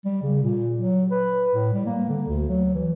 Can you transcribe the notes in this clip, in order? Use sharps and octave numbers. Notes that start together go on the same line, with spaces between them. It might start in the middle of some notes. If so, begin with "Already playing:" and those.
G3
C#3
A#2
F#3
B4
A2
G3
A#3
D3
D2
F#3
E3